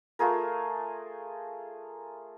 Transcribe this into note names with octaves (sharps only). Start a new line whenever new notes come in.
A3 F4 G#4 A#4